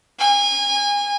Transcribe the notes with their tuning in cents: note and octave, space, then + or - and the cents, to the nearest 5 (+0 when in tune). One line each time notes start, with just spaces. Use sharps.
G#5 -30